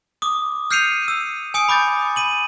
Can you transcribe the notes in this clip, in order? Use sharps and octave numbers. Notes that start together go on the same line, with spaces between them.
D6 D#6
F6 G6 C7 C#7 D#7 F7
E6
G#5 D#6 C#7
B5 D6 G6 A6
B5 D#7 F#7